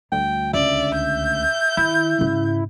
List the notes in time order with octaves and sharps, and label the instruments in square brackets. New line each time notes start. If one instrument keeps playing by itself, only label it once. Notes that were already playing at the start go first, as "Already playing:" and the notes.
[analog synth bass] D2 [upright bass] G3 [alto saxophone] G5
[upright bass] C#2 [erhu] D5 [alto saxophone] E5
[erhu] G6
[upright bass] D#3 [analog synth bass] E4
[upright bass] G#2 C#3